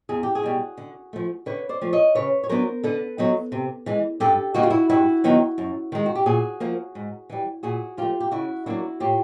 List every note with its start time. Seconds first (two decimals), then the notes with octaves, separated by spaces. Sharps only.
0.09 E2 G#4
0.23 G4
0.35 F#4 G#4
0.43 B2 G3
0.77 D3
1.13 F3 A3
1.46 D3 B4 C#5
1.69 C5 D5
1.82 F3 A3
1.93 C#5 D#5
2.15 C#3 B4 C#5
2.44 C#5
2.49 F#3 B3 D4 A#4 C5
2.84 D3 A4 B4
3.18 F#3 B3 D#4
3.52 C3
3.86 E3 G#3
4.20 G2 G4 A4
4.54 D3 G3 A#3 D#4 F#4
4.63 F4
4.70 E4 F#4
4.90 G2 E4 F#4
5.24 D#3 F#3 B3 D#4
5.58 F#2
5.92 D#3 G#3
6.06 F#4
6.15 G4
6.26 A#2 F#4 G#4
6.60 F3 A#3
6.95 G#2
7.30 E3 G3
7.63 A#2 F#4 G#4
7.98 F3 A3 F4 G4
8.20 G4
8.31 C#3 E4 F#4
8.66 F#3 A#3 D4 E4 F#4
9.00 A2 F4 G4